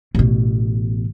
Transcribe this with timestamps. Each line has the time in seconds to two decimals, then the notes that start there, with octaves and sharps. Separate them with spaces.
0.15 A1 B2